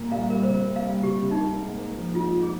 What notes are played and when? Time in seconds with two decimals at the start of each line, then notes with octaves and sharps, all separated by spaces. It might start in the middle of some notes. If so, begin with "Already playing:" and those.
Already playing: C2 A#2 G3 A#3
0.12 C2 F5
0.30 G3 A#4
0.43 C5
0.49 C3 A#4
0.66 A#3
0.76 F5
0.85 G3
1.03 C3 G4
1.22 C3
1.31 D#4
1.40 A#3
1.60 G#2
1.78 A#3
1.97 F3
2.14 G#2 F4
2.34 G#2
2.43 G#4